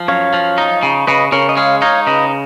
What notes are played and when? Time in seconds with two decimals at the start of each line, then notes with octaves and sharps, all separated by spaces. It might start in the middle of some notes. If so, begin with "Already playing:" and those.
Already playing: F3
0.08 F#2 C#5 F5
0.33 F3
0.58 D#4
0.83 C#3
1.07 C#3 B4 D#5
1.32 C#3 A#4 C#5
1.49 D#5
1.57 G#3 C#5 F5
1.82 D#4 C#5 F5
2.07 C#3 B4 D#5